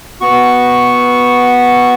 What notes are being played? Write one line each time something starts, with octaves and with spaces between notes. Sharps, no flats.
B3 F#4 C#6